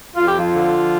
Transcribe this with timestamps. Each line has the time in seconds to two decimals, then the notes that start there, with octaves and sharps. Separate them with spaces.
0.16 F2 F4
0.27 G4
0.39 F3 F4
0.53 D3